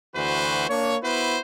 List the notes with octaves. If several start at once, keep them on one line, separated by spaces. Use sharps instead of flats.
D2 E3 F#4 B4 C5
A#3 D4 C#5
B3 E4 F#4 B4 C5